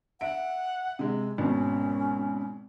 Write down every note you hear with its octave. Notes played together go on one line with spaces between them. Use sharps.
E5 F#5 D7
C3 G#3
G#1 B2 C#4